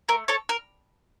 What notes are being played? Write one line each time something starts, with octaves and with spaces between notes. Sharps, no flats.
A3 A#4
A4 C#5
A#4